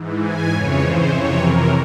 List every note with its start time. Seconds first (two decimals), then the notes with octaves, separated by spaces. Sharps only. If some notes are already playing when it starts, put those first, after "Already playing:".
Already playing: G#2 E3
0.22 G#5
0.51 F2 C#3 E3 C#5
0.81 C5
1.10 F2 C3 E3 C#5
1.40 A#4